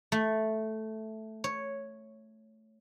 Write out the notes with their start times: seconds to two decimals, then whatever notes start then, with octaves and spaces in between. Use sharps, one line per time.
0.12 A3
1.44 C#5